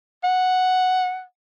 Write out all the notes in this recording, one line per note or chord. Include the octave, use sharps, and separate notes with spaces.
F#5